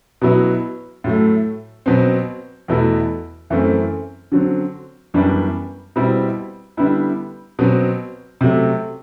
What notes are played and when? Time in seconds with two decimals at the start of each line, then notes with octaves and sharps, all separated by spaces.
0.21 B2 F#3 B3 E4
1.04 A2 F#3 A3
1.86 B2 F#3 C4
2.68 E2 B2 A3 E4
3.50 F#2 E3 A3 C4
4.32 D3 F#3 C4
5.14 F#2 E3 G3 B3 D4
5.96 B2 G3 C4 E4
6.77 D3 G3 B3 E4
7.59 B2 F#3 C4
8.41 C3 F#3 A3